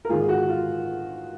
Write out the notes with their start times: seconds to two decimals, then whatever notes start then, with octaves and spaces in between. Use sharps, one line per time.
0.05 A#4
0.09 G#2 F4 G#4
0.12 D#3
0.20 G#4
0.29 F#4
0.49 F4